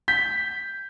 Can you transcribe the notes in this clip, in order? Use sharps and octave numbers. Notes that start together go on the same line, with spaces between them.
G6 B6